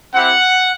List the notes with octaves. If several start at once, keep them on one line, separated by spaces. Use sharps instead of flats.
C4 E4 G4 F#5